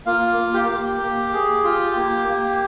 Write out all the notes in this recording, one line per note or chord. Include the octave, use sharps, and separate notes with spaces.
A#3 F4 F5
A#3
G4 G5
A#3
A#3
G#4
F4
A#3
A#3